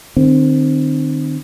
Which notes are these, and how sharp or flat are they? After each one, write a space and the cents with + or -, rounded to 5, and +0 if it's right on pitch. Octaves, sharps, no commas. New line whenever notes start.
D#3 -45 C4 +0